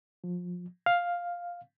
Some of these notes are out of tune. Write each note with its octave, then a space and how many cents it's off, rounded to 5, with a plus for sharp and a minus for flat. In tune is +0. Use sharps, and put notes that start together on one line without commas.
F3 +25
F5 +5